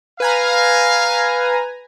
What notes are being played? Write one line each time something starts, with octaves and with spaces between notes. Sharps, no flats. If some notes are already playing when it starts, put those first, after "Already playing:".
B4 F5 G#5 A#5